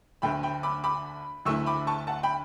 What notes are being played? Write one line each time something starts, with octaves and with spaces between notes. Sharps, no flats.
D2 D3 A3 G5 B5
G5 B5
B5 D6
B5 D6
D2 D3 A3 E4 C#6 E6
B5 D6
A5 C#6
F#5 A5
G5 B5